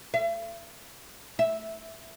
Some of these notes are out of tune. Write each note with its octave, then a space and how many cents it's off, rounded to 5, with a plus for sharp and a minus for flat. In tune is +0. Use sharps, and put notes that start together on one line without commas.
E5 +45
E5 -10